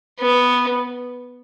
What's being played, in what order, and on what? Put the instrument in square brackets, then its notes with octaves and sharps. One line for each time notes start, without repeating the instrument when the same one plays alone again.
[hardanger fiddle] B3